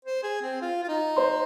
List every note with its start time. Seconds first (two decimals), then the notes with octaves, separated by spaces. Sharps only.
0.05 C5
0.23 G#4
0.42 C4
0.62 F4
0.83 F4
0.89 D#4
1.16 C5 C6